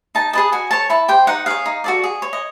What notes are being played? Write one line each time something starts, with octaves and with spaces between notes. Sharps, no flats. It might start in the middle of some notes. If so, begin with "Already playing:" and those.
D#4 A5
G#4 B4 D#5 A5
F#4 G#5
A4 C#5 A5
E4 A5
G4 C5 G5
D#4 F#5
G#4 C#5 F5
D#4
F#4 A4 D5
G#4
C#5
D#5